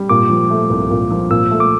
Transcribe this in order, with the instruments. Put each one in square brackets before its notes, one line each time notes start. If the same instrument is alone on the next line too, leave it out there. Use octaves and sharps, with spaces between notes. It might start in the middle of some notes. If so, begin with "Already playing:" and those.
Already playing: [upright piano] G3
[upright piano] A#2 [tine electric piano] D6
[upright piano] F3
A3
C2
A#2
F3
[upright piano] A#2 [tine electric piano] E6
[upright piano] A3
[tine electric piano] D6